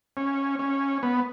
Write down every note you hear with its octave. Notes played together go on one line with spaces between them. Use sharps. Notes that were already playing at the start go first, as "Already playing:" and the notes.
C#4
C#4
B3